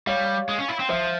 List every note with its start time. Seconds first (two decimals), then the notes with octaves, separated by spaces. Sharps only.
0.07 G3 C#5 F5
0.49 G#3
0.59 C#4
0.68 E4
0.80 C4
0.89 F3 C5 E5